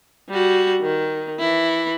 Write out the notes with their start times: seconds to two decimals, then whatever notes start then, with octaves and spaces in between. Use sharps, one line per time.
0.29 G3 F#4
0.82 D#3
1.39 E3 E4